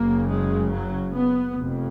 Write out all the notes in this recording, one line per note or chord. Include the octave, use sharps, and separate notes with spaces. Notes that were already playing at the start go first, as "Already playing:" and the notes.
Already playing: F#1 F#2 C#3 A#3
G#3
F#3
B3
F1 F2